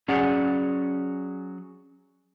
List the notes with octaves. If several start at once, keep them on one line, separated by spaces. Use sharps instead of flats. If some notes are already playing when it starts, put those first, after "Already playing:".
F#3 C#4 G#4 D5 F#5